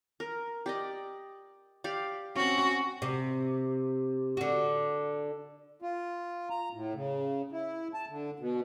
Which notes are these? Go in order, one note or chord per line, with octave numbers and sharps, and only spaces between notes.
A#4
G4 D5 D#5
G4 D5 F5
C4 C#4 F#4
C3
D3 F#4
F4
A#5
A2
C#3
E4
A5
D3
B2